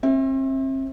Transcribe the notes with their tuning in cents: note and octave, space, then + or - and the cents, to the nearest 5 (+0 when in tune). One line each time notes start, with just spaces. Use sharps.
C4 +40 E5 -10